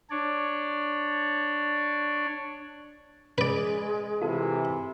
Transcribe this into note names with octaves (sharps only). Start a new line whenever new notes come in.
D4 C#5 D5
G#3 C#4 B4 D5
C3 E3 F4 A4